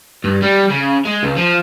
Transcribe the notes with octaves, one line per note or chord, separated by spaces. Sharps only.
G2
G3
C#3
G#3
C#2
F3